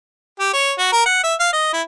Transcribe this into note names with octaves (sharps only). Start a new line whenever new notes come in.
G4
C#5
F#4
A#4
F#5
E5
F5
D#5
E4